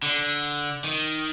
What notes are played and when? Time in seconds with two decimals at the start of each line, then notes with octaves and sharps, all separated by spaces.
0.02 D3
0.84 D#3